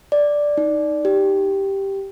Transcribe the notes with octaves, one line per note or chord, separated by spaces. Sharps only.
D5
D#4
G4